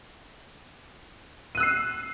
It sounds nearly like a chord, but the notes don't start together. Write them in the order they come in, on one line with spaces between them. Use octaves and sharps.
D#7 F#6 E6 C7